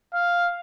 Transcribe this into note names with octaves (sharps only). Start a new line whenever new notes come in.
F5